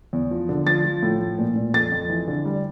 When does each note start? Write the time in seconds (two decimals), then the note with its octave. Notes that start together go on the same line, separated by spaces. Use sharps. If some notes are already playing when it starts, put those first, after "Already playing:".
0.13 E2
0.31 F3
0.49 D3
0.67 F3 A6
0.85 F3
1.02 A2
1.20 F3
1.38 A#2
1.56 A#2
1.74 F2 A6
1.92 F2
2.10 E3
2.28 D3
2.45 G3